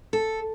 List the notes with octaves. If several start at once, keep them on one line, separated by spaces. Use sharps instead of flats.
A4